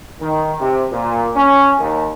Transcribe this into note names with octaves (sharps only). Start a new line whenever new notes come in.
D#3
C3
A#2
C#4
D#2